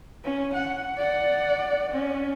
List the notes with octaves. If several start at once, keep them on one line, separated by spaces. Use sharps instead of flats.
C#4
F#5
D5 F#5
C#4